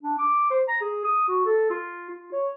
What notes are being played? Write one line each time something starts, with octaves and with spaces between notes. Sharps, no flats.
D4
D6
C5
A#5
G#4
D#6
F#4
A4
F4
F4
C#5